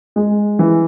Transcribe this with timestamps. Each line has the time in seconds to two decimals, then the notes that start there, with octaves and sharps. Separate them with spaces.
0.16 G#3
0.59 E3